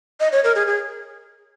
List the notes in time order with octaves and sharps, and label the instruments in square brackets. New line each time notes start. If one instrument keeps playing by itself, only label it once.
[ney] D#5
C#5
A#4
G#4
G#4